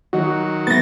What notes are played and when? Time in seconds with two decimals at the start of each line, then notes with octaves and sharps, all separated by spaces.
0.13 D#3 F#3 F#4 D#5
0.67 E3 B3 A6 A#6